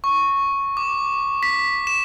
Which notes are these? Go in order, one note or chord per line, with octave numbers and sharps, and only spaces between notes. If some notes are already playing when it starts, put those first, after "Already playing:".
C#6
D6
B6
E7